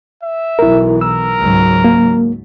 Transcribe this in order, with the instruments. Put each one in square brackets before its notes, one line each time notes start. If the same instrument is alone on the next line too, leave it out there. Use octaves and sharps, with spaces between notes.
[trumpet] E5
[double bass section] B1 E3 [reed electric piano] E4 A#4
[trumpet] A#4 [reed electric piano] E6
[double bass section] C#2 G#2 F#3
[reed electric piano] A#3